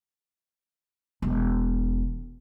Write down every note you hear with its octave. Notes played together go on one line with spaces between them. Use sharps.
E1